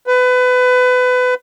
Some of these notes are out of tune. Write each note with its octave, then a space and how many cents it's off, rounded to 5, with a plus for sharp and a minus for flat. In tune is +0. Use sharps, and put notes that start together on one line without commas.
B4 +25